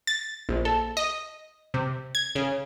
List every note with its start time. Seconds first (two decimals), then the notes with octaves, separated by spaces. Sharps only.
0.07 A6
0.49 A#1
0.65 A4
0.97 D#5
1.74 C3
2.15 G#6
2.35 C#3